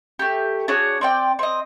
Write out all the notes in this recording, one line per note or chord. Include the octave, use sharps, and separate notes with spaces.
A3 G4
D4 F#4 G#4 C#5
C4 D5 G5
C4 D#5